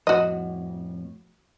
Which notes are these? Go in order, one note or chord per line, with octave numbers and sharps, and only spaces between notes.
F2 A2 F#4 D#5